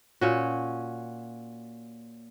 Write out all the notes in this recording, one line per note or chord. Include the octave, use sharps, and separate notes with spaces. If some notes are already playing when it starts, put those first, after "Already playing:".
A#2 C#4 F#4